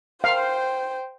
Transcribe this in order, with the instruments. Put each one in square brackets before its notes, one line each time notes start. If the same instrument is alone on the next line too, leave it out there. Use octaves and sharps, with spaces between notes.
[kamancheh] C5 G5 [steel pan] F5